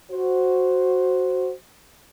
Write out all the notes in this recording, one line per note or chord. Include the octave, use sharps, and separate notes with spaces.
F#4 C5